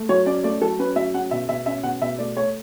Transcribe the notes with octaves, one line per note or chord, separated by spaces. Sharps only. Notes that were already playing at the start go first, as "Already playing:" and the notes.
Already playing: A3
F#3 C#5
C#4 D5
A3 D5
F#3 A4
C#4 B4
F#3 E5
C#4 F#5
B2 E5
B2 E5
C#4 E5
B2 F#5
B2 E5
A3 D5
A3 C#5